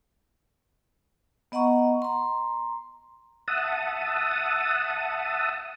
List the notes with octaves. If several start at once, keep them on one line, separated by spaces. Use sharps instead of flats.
B3 D#5 F#5 A#5 C#6
A#5 C6
E5 F#5 A5 D#6